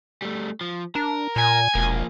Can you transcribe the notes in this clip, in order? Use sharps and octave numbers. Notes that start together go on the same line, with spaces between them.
G3 A3
F3
D4 A#4
A#2 G#5
E1 F3 A#3